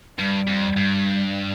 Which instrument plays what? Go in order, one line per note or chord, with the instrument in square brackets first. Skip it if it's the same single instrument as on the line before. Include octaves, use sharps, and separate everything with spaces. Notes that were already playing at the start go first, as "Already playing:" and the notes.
[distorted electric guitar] G2 [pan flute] G3
[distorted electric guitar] F2
G2